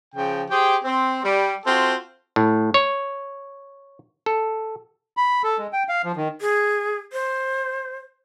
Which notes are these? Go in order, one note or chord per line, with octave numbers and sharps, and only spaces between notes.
C#3 F3 G5
G4 G#4 C5 G5
C4
G3
C4 F4 F#4 A4
A2
C#5
A4
B5
A4
G#3
G5
F5
F3
D#3
G#4
C5